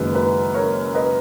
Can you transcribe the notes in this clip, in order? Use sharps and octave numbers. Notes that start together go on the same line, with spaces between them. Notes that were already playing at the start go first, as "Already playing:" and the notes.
Already playing: F#1 F#2 D#3 G#3 B4
B4
A#4 C#5
B4 D#5